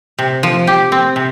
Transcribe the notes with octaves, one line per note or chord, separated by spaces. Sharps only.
C3
F3
G4
C4
C3